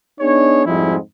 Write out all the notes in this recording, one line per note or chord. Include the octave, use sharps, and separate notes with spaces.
B3 D4 D#4 G#4 C#5
F2 G#2 F3 G3 G#3 E4